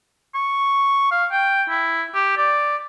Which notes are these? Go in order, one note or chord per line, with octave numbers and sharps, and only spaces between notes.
C#6
F5
G5
E4
G4
D5